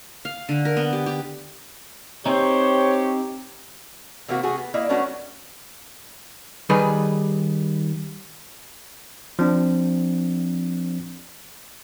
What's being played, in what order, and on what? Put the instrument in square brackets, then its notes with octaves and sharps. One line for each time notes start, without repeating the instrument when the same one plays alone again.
[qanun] F5
D3
A#4
B3
G4
G4
[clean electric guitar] C4 D#4 [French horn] G4 [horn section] C5 C#5
[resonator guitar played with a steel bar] C3 E3 A#3 C4 F#4
A3 F#4 G#4
B3
A#3 E4 D5 D#5
F#3 A3 B3 C#4 D4 F#4
[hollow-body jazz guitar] D#3 G3 D#4 G#4 B4
[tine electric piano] F3 C4 D4